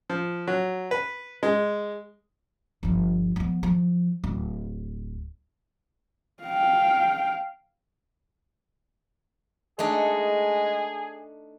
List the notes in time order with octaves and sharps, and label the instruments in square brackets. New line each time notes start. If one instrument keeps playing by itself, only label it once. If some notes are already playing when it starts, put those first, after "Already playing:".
[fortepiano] F3
F#3
B4
G#3
[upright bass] G1 F3
F3 B3
F3
D1
[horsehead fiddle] F5 G5
[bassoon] G#3 [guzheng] A3 D4 D#4 [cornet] G#4